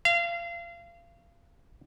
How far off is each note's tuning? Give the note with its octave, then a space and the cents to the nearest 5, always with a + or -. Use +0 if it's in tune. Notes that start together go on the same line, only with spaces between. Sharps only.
F5 -30